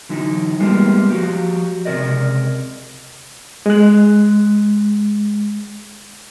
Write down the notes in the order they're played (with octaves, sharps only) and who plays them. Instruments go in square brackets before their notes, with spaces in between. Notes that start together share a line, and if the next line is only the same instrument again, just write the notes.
[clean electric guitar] D3 E3 F#3 D#4
G3 G#3 A#3 B3 F4 G4
F3 F#4 G4
C#2 C3 B3 A#4 D5 D#5
[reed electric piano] G#3 F#6